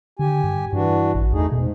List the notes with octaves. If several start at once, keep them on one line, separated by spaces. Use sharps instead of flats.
D3 G4 G#5
G2
G2 E3 D4 F#4
A1
E2 A3 D#4 G#4
G#2 B2